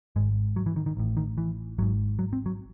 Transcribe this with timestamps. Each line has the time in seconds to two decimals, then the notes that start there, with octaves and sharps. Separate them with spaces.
0.16 G#1 G#2 G#3
0.56 F#3
0.66 E3
0.76 D#3
0.86 D#3
0.97 A1 A2
1.17 D#3
1.38 E3
1.78 G#1 G#2 F#3
2.19 F#3
2.33 C4
2.46 F#3